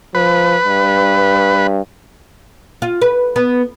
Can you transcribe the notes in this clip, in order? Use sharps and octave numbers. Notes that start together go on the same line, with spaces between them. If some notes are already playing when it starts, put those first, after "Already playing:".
F3 B4
G2
F4
B4
B3